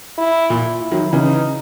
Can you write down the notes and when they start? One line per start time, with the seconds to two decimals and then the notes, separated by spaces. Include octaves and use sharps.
0.18 E4
0.50 A#2
0.81 E4
0.91 D#3 F#3
1.13 C#3 E3 D#4